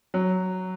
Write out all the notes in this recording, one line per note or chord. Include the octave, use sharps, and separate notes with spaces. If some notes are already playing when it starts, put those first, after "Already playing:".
F#3